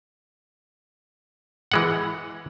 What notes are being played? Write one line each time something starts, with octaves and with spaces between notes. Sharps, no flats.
E3 G#3 F#5